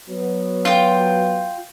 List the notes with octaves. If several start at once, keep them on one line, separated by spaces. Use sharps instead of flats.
F#3 B3
F4 G5